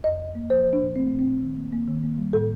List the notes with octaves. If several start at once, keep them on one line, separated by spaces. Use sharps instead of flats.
F2 D#5
F2
A#3
F3 C5
F3
D4
A#2
A3 C4
C4
A#2
C4
A#2
D#3
A#3
A#3
D#3
A#3
G3
A2 A4